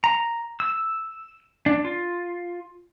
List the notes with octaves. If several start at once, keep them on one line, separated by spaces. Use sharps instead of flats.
A#5
E6
D4
F4